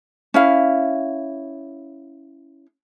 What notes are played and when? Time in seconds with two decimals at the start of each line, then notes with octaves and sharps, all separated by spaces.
0.34 C#4 E4 F5